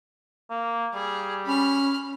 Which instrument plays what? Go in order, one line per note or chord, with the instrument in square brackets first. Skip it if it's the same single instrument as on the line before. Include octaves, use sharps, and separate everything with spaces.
[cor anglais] A#3
[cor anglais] G3 [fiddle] G#4
[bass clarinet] C#4 [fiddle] B5 F6